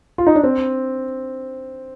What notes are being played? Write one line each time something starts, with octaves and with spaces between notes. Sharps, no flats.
F4
D#4
D4
C4